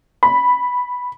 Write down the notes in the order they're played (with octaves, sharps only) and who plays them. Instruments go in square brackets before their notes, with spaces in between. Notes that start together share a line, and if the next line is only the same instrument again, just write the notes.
[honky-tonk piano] B5